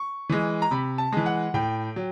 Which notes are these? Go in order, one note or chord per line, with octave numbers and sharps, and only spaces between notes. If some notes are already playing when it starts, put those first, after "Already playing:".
Already playing: C#6
E3 G#3
A#5
C3 B5
A5
E3 G#3
F#5
A2 G5
F#3